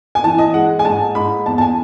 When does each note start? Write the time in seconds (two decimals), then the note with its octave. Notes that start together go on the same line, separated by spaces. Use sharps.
0.15 G#5
0.24 E3 A5
0.38 D#5
0.54 G#3 F#5
0.79 G#5
0.85 G#2 A5
1.15 G#2 B5
1.46 E2 A5
1.58 A5
1.61 G#5